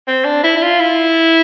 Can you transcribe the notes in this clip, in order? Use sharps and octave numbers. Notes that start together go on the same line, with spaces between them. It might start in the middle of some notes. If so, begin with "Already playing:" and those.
C4
D4
E4
E4
F4
E4